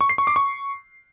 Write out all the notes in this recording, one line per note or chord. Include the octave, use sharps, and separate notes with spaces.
C#6
C7
C#6
D6
C#6